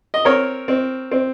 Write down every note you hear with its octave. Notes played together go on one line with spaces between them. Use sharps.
D#5
C4 A#4 C#5
C4
C4